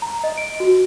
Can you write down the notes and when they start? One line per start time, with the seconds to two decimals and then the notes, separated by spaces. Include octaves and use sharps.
0.02 A#5
0.24 D#5
0.37 D7
0.60 F#4